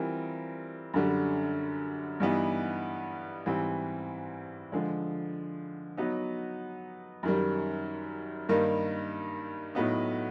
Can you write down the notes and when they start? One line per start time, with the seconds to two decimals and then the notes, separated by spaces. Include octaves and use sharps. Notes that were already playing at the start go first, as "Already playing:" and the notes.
Already playing: E3 G3 C4 F4 A#4
0.94 F#2 D3 G3
2.20 G2 E3 G3 B3 D#4
3.46 G#2 E3 G3 C4
4.72 D3 F3 G#3
5.97 F#3 B3 D#4
7.23 F#2 D#3 G3
8.49 G2 D#3 G3 A#3 D#4
9.75 A2 F#3 B3 D#4